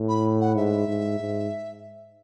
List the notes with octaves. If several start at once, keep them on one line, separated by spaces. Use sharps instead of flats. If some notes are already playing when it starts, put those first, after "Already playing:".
Already playing: A2
B5
F#5
G#2 E5
G#2
G#2